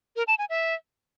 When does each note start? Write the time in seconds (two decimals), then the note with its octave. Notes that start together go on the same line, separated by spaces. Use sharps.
0.16 A#4
0.27 A5
0.39 G#5
0.50 E5